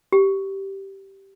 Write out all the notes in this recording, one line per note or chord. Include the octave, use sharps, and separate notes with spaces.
G4